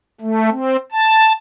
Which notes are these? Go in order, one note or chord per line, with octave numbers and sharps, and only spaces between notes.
A3
C4
A5